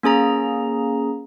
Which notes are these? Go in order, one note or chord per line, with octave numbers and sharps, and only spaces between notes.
A#3 C#4 G#4 A#5